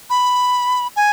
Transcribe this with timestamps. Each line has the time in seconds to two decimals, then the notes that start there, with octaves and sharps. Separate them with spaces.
0.10 B5
0.96 G#5